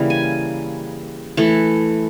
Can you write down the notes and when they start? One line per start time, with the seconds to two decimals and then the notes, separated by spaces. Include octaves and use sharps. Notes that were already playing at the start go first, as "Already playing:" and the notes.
Already playing: C#3 E3 G3 A#3
0.10 G#5
1.37 E3 A3